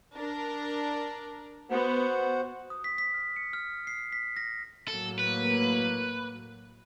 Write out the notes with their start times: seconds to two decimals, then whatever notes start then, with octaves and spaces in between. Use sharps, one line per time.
0.15 D4 A#4
1.71 B3 F#4 C5 F#5
2.70 D#6
2.84 B6
2.98 B6
3.14 F6
3.36 C#7
3.53 F6
3.87 C7
4.12 B6
4.36 A#6
4.88 A2 F#3 A#3 A4
5.19 B4